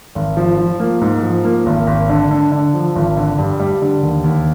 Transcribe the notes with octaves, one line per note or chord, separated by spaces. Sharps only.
G#1
F3
F3
A#3
G#2
F3
A#3
G#1
G#1
D3
D3
D3
F3
G#1
D3
G2
G3
D3
D#2
D#2